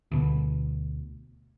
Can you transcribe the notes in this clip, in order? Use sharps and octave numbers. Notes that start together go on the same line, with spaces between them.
D2 B2